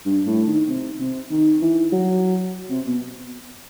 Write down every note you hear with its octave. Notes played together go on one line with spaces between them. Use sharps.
G2
A2
D#3
C3
C3
D#3
E3
F#3
C3
B2